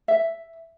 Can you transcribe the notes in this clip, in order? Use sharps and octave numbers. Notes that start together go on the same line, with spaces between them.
E5